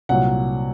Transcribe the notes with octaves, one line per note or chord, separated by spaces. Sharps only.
C2 A#2 F#3 F#5